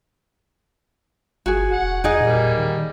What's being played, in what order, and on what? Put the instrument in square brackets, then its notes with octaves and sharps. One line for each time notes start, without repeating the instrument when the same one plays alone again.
[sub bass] G1 [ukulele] F#4 G#4
[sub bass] E1 [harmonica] F#5
[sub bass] E2 [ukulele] D#4 G#4 D#5
[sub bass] A#2 [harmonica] G3 A#3
[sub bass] D#3